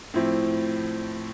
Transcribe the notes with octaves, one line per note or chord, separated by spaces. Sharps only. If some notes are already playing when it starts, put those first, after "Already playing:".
A2 F3 C4 E4